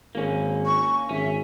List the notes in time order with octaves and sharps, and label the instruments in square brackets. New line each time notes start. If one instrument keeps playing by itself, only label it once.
[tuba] G#1 [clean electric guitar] A#3 C#4
[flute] C#6
[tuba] G#1 [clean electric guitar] C#4 [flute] E5